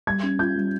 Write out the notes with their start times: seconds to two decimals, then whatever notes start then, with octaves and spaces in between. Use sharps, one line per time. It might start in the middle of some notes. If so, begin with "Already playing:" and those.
0.07 G3 G#6
0.23 C#4
0.39 F4 G6
0.55 G3